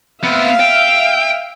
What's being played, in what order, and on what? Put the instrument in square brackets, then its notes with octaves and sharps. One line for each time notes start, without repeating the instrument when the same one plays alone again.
[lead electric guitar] B3 C4 [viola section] E5 F5
[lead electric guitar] G5